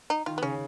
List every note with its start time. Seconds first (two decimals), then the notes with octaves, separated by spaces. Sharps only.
0.10 D#4
0.26 D#3 F4
0.38 B3
0.42 C#3 C#4